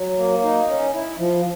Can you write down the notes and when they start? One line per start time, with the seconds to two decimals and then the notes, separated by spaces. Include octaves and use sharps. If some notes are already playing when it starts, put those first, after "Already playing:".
Already playing: F#3
0.17 A#3
0.43 D#4
0.68 C#4
0.93 E4
1.19 F3